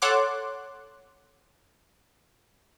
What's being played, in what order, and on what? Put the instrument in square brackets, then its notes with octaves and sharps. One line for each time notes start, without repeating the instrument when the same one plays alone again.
[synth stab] A4 C#5 F#5 C6 D6 F#6